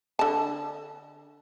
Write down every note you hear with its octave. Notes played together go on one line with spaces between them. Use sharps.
D3 A5